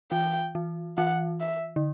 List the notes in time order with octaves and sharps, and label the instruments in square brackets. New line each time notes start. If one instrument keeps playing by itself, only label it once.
[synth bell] E3 [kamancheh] G5
[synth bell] E3
[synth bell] E3 [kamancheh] F#5
[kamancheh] E5
[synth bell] D3